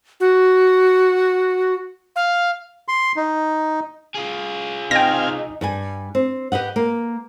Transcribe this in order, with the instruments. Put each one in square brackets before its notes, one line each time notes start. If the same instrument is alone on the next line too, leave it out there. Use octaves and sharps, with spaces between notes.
[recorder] F#4
F5
[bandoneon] C6
D#4
[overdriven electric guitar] F4 G#4
[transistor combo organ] C4 F5 G#5 [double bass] D#4 [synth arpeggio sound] G5 A#6
[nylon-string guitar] G2 G3 G#5
C4
G4 B4 D#5 F#5
A#3